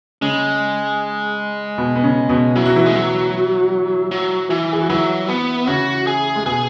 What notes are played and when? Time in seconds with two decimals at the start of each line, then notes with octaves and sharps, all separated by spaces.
0.21 C#3 G#3 C#4
1.78 B2 B3
1.96 B3
2.03 C#3 C#4
2.29 B2 B3
2.56 F#3 E4
2.65 F#4
2.76 E3 E4
2.86 G#3
2.95 F#3
4.11 F#3
4.50 E3
4.73 G#4
4.81 F#4
4.90 E3 F#3 E4
5.29 B3
5.67 C#3 C#4 F#4
6.07 G#4
6.36 G#3
6.45 B2 B3 G#4